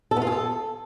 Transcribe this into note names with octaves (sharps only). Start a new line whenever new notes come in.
A4
B3
F4
G#4
A4